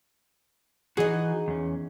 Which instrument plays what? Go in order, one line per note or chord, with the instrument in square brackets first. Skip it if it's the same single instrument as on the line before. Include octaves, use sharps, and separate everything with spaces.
[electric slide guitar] E3 F#4 [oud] D#4 G#4
[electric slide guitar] E2 C#4